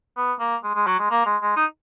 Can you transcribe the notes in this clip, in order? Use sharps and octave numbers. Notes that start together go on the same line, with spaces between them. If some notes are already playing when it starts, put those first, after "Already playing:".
B3
A#3
G#3
G#3
F#3
G#3
A#3
G#3
G#3
D#4